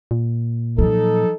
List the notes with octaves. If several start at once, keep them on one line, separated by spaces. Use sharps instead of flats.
A#2
F3 F#3 D#4 A4